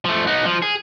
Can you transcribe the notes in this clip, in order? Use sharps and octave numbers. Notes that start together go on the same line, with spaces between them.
F3 A3
B3 D#4
F3
G#4